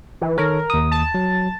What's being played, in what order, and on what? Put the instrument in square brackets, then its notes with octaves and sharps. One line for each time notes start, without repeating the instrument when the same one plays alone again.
[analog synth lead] E3
[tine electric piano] D#3 A4 C#5 [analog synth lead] A#4
[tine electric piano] D#2 D#6
[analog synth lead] A5
[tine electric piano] F#3